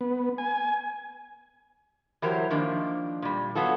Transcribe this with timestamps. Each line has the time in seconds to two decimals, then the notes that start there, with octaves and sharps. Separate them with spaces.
0.01 B3
0.38 G#5
2.22 E3 F#3 G4 A#4 C5
2.50 D#3 F3 A#3 D4
3.22 A#2 G3
3.55 F#3 B3 F4 F#4 A4